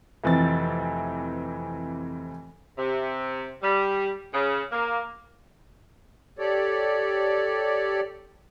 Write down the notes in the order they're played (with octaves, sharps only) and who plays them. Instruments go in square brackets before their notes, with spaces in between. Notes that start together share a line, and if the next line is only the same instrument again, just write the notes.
[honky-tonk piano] F1 E3 C4 A6
[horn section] C3
G3
C#3
A#3
[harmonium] G4 A4 C#5 D5